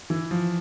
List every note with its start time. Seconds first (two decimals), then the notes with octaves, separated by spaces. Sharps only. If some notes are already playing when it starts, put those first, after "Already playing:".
0.10 E3
0.31 F3